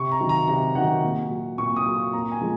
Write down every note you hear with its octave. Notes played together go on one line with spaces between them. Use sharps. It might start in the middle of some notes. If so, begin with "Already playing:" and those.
Already playing: C3 C#6
A#5
D#3 F#3
A#5
C3 A#5
D#3 F#3 F#5
A#2
F#3
A#2 C#6
D#6
F#3
C#6
A#2 A#5
G#5
F3 G#3